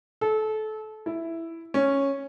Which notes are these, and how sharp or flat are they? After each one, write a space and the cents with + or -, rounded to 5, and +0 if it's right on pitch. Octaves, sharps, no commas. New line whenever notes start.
A4 -25
E4 +5
C#4 -5